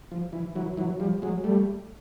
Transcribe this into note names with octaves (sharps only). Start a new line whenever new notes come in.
F3
E3
E3 F#3
E3 F#3
F3 G3
F#3 G#3
G3 A3